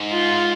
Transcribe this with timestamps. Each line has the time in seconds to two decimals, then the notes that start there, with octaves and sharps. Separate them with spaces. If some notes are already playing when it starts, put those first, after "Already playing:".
Already playing: G#2
0.10 F4